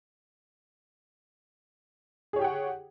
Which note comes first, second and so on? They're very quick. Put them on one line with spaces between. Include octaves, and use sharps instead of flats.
G#4 C#5 G4 G5 F#5